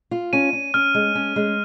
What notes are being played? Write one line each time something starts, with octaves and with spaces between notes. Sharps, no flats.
F4
C#4 D#7
C#4
C#4 F6
G#3
C#4
G#3